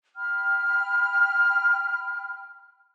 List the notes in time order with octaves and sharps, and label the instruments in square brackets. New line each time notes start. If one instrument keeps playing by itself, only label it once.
[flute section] G5 B5 F6